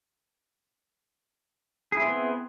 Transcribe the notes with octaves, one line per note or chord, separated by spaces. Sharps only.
B3 C4 E4 G#4